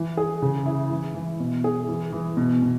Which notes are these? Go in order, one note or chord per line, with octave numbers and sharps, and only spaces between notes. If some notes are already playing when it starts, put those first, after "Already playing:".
Already playing: E3
G#4
C#3
E4
E3
E3
B2
G#4
E3
E3
B2
B2